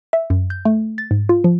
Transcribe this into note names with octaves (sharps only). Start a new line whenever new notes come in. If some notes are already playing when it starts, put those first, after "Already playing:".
E5
F#2
G6
A3
A6
G#2
F4
F3